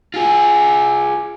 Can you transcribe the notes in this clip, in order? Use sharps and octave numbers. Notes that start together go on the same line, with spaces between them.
F4 G#4